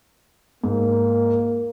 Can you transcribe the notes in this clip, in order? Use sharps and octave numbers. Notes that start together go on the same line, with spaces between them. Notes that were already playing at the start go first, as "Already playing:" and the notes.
G#2 A#3